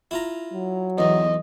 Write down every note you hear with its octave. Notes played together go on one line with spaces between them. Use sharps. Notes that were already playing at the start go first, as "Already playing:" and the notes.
E4 F4 A#5
F#3
B1 E2 D#5